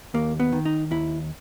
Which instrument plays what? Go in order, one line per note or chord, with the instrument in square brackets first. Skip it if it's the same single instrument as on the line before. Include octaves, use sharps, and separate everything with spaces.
[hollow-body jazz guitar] D#2 A#3
B3
D#3
D#4
D#2 E4